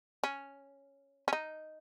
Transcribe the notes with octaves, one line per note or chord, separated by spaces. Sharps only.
C#4
C#4
D#4